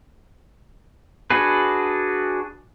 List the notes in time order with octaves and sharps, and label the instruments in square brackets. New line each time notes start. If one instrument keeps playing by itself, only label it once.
[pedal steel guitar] D4 F#4 G#4 B4